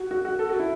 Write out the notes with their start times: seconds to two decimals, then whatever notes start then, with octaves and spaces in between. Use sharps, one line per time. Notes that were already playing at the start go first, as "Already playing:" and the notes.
Already playing: F#4
0.11 F#4
0.25 F#4
0.39 A4
0.49 F#4
0.59 E4